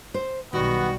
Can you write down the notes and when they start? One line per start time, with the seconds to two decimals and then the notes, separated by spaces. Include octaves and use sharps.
0.14 C5
0.53 B1 D#3 G3 B3 F#4